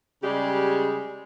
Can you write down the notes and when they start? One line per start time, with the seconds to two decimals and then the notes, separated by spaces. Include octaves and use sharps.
0.23 C#3 G3 G#3 G4